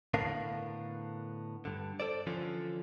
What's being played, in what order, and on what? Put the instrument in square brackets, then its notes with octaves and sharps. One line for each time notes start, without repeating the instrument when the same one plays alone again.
[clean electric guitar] A2 D3 B3 D4 A#4 F5
G2 D3
A4 C5 D5
D3 E3 F3 C#4 F4 A4